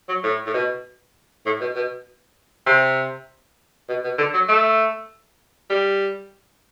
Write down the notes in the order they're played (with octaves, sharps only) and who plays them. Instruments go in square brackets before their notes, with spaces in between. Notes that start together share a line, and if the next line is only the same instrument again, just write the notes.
[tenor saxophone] F#3
A2
A2
B2
A2
B2
B2
C3
B2
B2
D3
F#3
A3
G3